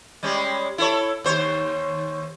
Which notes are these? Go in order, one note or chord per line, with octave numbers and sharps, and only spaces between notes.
G3 G#3 C#4
E4 A4 C#5
D#2 C5 C#5